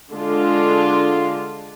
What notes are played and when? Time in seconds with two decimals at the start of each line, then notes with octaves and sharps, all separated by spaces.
0.11 D3 G#3 D4 F4